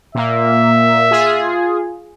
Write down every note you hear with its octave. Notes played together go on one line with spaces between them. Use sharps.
A#2 A#3 E5
F4 G#4